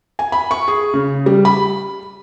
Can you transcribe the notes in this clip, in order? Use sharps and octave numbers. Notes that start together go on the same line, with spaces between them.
G#5
B5
C#6
G#4
C#3
G3
B5